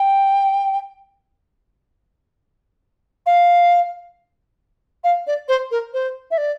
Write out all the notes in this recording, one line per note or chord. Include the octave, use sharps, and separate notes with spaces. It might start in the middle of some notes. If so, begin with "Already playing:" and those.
Already playing: G5
F5
F5
D5
C5
A#4
C5
E5
D5